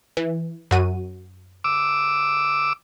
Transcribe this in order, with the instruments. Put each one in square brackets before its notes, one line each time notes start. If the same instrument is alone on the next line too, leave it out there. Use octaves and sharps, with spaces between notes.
[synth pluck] E3
F#2 F#4 D#7
[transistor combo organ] D6 E6